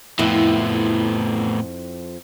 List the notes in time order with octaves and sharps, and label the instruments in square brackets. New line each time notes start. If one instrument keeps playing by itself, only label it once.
[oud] F2 E4 [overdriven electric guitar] A2 B3